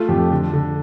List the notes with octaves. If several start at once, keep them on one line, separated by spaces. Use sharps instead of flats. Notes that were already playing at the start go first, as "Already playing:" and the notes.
Already playing: A3 F4
F2 G4
D3
D3